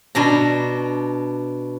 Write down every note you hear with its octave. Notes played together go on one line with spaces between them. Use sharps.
B2 D4 A#5